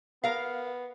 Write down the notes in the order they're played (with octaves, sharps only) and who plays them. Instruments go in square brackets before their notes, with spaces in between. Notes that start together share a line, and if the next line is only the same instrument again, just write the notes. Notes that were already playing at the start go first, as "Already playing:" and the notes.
[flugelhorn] B3 [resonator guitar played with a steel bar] A#4 F5